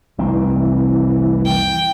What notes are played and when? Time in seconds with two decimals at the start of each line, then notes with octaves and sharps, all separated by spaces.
0.18 F1 C2 E3 C4
1.45 G5